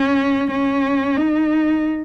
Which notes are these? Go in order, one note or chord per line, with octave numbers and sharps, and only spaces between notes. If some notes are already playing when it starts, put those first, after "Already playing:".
Already playing: C#4
C#4
D#4